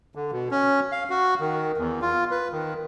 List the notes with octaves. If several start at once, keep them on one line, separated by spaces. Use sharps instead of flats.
D3
B2
C#4
F5
F#4
D#3
E2
F4
B4
D#3